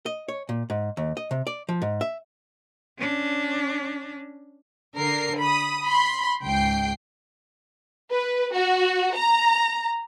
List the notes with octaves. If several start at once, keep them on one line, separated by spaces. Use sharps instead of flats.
D#5
C#5
A#2
G#2
D#2
D#5
C3
D5
F3
G#2
E5
C#4 D4
D3 A#4 C7
B5 D#6
B5 C6
C#2 G#2 G5 C7
B4
F#4
A#5